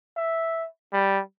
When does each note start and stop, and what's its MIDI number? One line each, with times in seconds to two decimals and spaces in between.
0.17 0.67 76
0.93 1.21 55